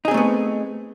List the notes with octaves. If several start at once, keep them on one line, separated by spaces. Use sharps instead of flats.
A3 B3 C4 D#4 G#4